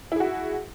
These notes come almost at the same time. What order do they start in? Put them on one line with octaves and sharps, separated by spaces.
E4 G#4 F#4